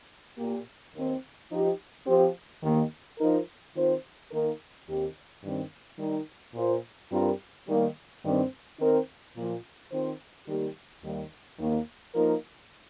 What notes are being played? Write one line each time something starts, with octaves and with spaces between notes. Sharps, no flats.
A#2 A#3 G4
D#2 D#3 C4
F3 D#4 G4
F3 C4 G4
D#2 D#3 A#3
F3 D#4 A#4
D#3 C4 F4 C5
D#3 A#3 D#4 A#4
D#2 D#3 C4 G4
G2 D#3 G3 C4
D#3 G3 D#4
A#2 A#3 F4 C5
G2 G3 C4 F4 A#4
D#3 G3 A#3
G2 D#3 G3 C4
D#3 C4 D#4 A#4
A#2 F3 A#3 F4
D#3 C4 F4 C5
D#3 G3 A#3 G4
D#2 D#3 G3 A#3
D#2 D#3 A#3
F3 A#3 D#4 A#4